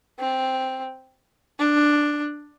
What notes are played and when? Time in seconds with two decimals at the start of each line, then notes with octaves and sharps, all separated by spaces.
0.19 C4
1.59 D4